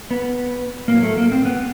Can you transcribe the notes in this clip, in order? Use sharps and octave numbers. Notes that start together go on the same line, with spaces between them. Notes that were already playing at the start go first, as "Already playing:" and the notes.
B3
A2 F#3 A#3
A3
A#3
C4
B3